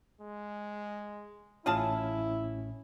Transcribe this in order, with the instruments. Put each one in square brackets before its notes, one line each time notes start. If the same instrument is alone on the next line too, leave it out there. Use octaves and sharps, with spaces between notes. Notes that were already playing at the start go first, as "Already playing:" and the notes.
[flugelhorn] G#3
[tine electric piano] A1 A2 C#4 [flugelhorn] E4 [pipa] F4 G#4 A5